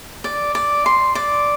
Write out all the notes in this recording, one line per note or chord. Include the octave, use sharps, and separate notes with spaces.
D5
D5
C6
D5